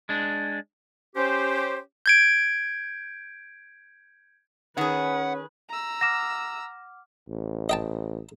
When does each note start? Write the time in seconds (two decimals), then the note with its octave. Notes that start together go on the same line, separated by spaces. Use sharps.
0.09 G#3 D4
1.16 C#4 G4 C5
2.06 G6 G#6 D7
4.78 D#3 C#4 G#4 B4 F#5
5.69 A#5 E6
6.01 F#5 D6 F6 A#6 E7
7.29 A1
7.69 D#5 G5 A5